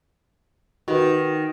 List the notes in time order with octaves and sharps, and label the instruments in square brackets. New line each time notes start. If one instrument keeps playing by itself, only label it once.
[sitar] D#3 [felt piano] F#4 B4